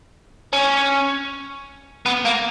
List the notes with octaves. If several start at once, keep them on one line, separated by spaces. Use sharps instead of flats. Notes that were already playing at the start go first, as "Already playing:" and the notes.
C#4
B3
A#3